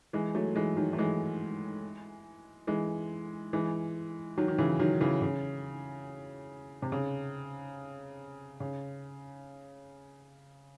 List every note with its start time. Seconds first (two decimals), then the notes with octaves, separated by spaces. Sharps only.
0.13 E3 G#3
0.35 F#3 A3
0.56 E3 G#3
0.77 D#3 F#3
0.93 A3
0.98 E3 G#3
2.67 E3 G#3
3.53 E3 G#3
4.38 D#3 F#3
4.48 D#3
4.58 C#3 E3
4.79 D#3 F#3
5.01 C#3 E3
5.22 C#3
6.82 C3
6.92 C#3
8.60 C#3